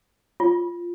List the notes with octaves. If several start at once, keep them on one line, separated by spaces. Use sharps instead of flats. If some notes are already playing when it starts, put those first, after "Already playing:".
F4